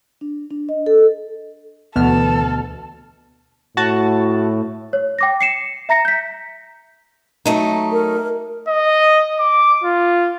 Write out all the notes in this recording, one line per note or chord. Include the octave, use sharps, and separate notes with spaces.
D4
D4
D#5
A4
D2 B2 E3 B3 A4 F6
A2 F#4 A5
C#5
G5 D6 A#6
C7 C#7 E7
E5 A#5 A#6 C#7
G6 B6
F#3 A3 D#4
A#4
D#5
D6
F4